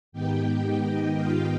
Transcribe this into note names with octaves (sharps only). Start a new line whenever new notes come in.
G#2 D#3 B3 D#4 G4 G5
D#4 D#5
F4 F5